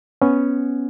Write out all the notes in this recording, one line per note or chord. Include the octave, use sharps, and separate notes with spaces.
B3 C#4